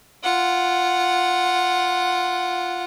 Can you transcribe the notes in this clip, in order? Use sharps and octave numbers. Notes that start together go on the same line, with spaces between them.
F4 F#5